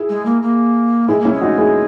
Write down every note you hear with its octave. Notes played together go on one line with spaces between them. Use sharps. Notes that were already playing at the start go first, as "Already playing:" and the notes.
Already playing: E4 G#4
G#3
A#3
A#3
G#3 E4 G#4
A#3 C#4 E4
G#3
D#4 F#4
E4 G#4